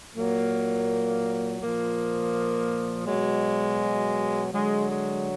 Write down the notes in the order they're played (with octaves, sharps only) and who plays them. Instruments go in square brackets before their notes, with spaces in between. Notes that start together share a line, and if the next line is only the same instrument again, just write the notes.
[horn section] A#2 F#3 A#3
A#2 F3 A#3
B2 F#3 G#3
D3 F#3 G#3
G#3